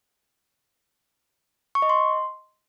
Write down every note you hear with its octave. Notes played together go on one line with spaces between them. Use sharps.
C#6
D#5
C6